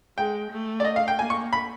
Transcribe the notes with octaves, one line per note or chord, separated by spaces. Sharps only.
G#3 G5
A3
D5
D#5
F5
G5
A#3 G#5
C#6
B5